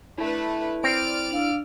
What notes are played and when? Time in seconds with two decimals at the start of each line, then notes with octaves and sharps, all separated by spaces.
0.18 A3 D4 E4 B4
0.84 C4 D5 F6 D7
1.31 D4 F5 E6